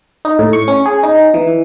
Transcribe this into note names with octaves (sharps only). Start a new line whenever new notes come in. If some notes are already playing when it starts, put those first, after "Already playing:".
D#4
A2
C#6
C#4
G#4
D#4
E3